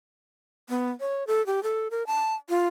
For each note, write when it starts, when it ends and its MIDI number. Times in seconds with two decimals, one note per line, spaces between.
0.69 0.90 59
1.00 1.27 73
1.27 1.45 69
1.46 1.63 67
1.63 1.88 69
1.91 2.06 70
2.07 2.34 81
2.49 2.67 65